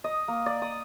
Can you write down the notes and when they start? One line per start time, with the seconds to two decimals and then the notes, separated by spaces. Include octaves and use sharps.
0.04 D#5
0.28 A#3
0.46 D5
0.62 D#6